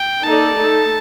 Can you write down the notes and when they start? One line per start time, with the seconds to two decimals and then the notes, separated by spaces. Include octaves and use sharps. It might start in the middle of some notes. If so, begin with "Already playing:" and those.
Already playing: G5
0.23 A#3 D#4 A4 D5 A5
0.56 A3 D#4 A4